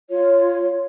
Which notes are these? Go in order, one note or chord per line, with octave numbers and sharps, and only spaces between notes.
F4 C#5